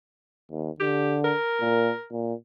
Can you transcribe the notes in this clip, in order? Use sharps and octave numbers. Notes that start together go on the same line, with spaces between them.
D#2
D3 G4
A#4
A#2
A#2